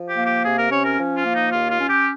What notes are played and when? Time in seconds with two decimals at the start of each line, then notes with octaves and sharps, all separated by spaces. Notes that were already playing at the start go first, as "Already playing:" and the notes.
Already playing: F3
0.09 G4
0.18 A#3
0.26 G4
0.45 C3 G#4
0.59 A#4
0.71 C#4 C#5
0.85 A#4
0.99 F3
1.17 F4
1.25 A#3
1.35 D#4
1.52 D#2 F4
1.71 F4
1.80 C#4
1.89 G4